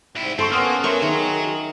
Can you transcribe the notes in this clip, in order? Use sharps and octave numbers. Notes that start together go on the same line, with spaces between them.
C2 G#2 C4 E4
G2 D3 C4 A4 C6 C#6
A#3 B3 C#4 F#5 C6 D#6 F6
F#3 A#4 C5 E5 C6 C#6
D#3 G#4